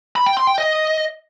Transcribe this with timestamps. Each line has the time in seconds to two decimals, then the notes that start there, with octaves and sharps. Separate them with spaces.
0.16 B5
0.26 G5
0.37 C6
0.47 G5
0.58 D#5